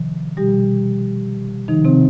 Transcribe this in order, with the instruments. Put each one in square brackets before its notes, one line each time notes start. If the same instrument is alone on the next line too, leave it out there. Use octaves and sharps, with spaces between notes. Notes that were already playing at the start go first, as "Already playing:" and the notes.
Already playing: [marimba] C3 D#3 F3
B2 G3 G4
C3 D#3 F3 D#4
C3 C4